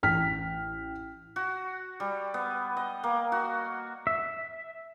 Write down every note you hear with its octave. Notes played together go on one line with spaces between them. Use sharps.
A1 G5 F6 B6
F#4
G3
B3
D#5
A#3
F#4
E5